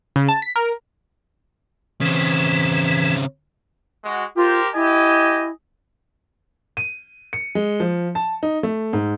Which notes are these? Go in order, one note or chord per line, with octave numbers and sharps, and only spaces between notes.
C#3
A5
B6
A#4
C#3 E3 C4
G#3 F#4
F4 G4 A#4 C5
E4 G4 D#5 G#5
D#7
C#7
G#3
F3
A5
D#4
A3
G#2